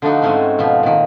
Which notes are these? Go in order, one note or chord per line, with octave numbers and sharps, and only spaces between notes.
D3 F3 A3 D4 D#4 F#4
G#2 G#3 A3 C4 C#4 F#4
B2 F3 C4
A#2 D#3